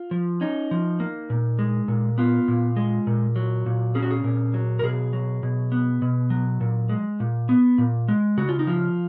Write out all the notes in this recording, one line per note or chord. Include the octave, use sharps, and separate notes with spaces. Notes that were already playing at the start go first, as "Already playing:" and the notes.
Already playing: F4
F3
C#4 D#4
F3
A#3
A#2
G#3
A#2
B3 F4
A#2
G#3
A#2
F#3
A#2
C#4 G#4
F#4
G#4
A#2
F#3
A#4
B2 G#4
F#3
B2
B3
B2
F#3
A#2
G#3
A#2
B3
A#2
G#3
C#3 F#4
F4
D#4
F3 F4